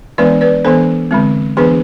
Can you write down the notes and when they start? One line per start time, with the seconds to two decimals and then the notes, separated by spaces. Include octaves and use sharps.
0.18 E3 G#3 B3 D4 B4 D5
0.41 B4 D5
0.65 E3 B3 D4 A4 C5
1.11 D3 G#3 C4
1.57 E3 B3 D4 G#4 B4